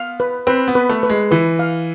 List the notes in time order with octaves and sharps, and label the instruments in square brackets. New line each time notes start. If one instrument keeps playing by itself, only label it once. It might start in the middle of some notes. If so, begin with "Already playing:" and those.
Already playing: [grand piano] B3 [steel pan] F5
[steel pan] B4
[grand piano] C4 [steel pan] B4
[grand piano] B3
[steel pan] B4
[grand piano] A3
[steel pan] B4
[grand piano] G#3
[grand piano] E3 [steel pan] B4
[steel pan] F5